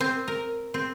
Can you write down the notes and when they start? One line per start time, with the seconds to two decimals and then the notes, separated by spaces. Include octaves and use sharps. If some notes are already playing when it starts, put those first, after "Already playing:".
0.01 C4
0.28 A#4
0.74 C4